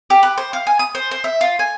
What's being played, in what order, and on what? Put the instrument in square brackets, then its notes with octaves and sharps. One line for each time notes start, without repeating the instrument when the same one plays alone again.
[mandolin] G4
B4
C5
F5
G#5
D#6
C5
C5
E5
F4
G#5